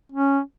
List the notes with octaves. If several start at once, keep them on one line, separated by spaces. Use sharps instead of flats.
C#4